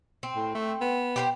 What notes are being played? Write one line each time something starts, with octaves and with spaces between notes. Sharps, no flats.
C4
A2
A3
B3
G4 B4 C5